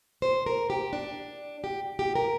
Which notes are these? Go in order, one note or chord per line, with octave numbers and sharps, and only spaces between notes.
C5
A#4
G4
D4
G4
G4
A#4